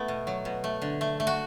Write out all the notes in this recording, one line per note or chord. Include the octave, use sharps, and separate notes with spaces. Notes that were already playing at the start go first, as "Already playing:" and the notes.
Already playing: A3 B3 E4
B2
F#3
B2
A3
D3
A3
A3
F#4